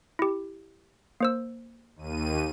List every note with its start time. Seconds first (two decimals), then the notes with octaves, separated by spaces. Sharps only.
0.19 E4 G4
1.21 A#3 C5 E6
1.96 D#2 D#7